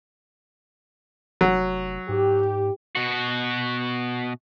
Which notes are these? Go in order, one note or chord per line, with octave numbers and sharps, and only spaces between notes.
F1 F#3
G#2 G4
B2 F#4